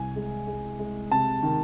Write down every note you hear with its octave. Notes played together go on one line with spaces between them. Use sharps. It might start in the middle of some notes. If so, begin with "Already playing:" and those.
Already playing: C2 G#5
G#3
G#3
G#3
C3 A5
D#3